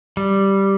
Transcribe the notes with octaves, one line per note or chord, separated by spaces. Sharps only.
G3